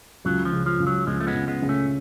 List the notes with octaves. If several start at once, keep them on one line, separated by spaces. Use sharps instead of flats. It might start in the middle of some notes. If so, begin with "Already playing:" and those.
C#2 F#3
F3
C#3
F3
C#2
F#3
C#2 F3 G#3
A3
G#3 B3
C#2
G#3 B3
C#3
A3 C#4